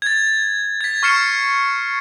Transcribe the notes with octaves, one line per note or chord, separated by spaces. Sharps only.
G#6 A6
G#6 B6
C#6 F6 C7 C#7 E7